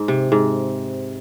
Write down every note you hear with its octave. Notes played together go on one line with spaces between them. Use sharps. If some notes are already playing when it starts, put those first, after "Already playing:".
Already playing: G#2
C3
G#2